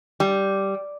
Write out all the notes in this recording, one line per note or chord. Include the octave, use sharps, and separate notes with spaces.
G3